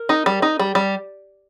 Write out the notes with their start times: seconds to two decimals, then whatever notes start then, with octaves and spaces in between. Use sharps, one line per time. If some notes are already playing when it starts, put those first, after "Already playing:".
Already playing: A#4
0.09 D#4
0.26 G3
0.42 D#4
0.59 G3
0.75 G3